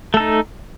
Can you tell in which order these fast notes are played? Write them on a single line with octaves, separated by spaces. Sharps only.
A3 A4 D#4